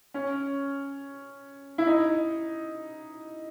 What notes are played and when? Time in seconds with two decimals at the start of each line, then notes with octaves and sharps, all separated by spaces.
0.14 C#4
1.78 E4
1.87 D#4